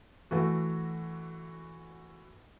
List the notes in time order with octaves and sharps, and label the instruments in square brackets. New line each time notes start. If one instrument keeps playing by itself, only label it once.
[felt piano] E3 A3 F#4